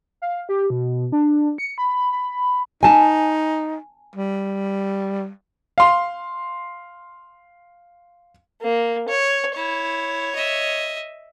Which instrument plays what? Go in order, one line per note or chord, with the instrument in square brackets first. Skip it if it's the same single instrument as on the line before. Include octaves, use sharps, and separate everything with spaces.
[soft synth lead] F5
G4
B2
D4
C#7
B5
B5
[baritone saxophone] D#4 [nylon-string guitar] G#5 A5
[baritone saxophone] G3
[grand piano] F5 C6
[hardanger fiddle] A#3
C#5
[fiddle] E4 [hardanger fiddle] C#5
[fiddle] D#5 E5